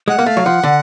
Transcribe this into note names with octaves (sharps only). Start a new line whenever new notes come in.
G#3 F#5
A#3
A3 F5
F#3
F3 F#5
D3